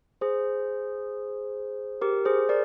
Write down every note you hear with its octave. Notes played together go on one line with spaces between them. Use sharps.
G#4 C5
G4 A#4
G#4 C5
A#4 D5